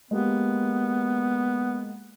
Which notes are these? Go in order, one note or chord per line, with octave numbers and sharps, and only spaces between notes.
G#3 A#3 B3 G4